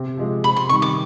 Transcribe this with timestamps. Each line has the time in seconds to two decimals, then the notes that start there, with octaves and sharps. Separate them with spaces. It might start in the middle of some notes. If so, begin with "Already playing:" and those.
Already playing: C3
0.18 F3 G#3
0.44 C3 B5
0.56 C6
0.69 D#3 G3 C4 C#6
0.82 D6